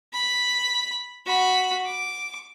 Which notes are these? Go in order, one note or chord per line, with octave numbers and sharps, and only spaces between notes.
B5
F#4 B5
D6